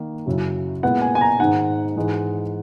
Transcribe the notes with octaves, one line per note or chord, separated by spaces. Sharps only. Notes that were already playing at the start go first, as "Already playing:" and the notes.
Already playing: D#3 A#3 D#4
F#2 C#3 F#3 C#4 E4
A#2 G#3 B3 E4 F#5
G#5
G#5
A#5
G#2 D#3 G#3 D#4 F#5
G#2 E3 G#3 D#4